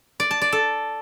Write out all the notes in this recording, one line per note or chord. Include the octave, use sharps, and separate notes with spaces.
D5
A5
D5
A4